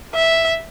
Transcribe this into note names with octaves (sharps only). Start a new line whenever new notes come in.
E5